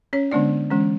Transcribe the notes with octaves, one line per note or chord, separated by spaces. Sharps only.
C#4 C#5
D3 G#3 B3 D4 D5
E3 G#3 C#4